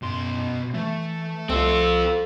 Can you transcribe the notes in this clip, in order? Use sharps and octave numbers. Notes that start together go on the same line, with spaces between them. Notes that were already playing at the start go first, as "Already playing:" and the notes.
F#2 B2 C6
E3 A3
C2 C4 F4 A4 C6 E6